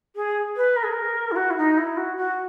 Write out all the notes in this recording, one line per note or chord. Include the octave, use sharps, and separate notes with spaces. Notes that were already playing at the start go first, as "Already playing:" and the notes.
G#4
B4
A#4
G#4
A#4
E4
F#4
E4
D#4
E4
F#4
F#4